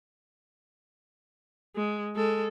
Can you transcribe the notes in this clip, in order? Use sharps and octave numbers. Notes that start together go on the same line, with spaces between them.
G#3
G#3 A4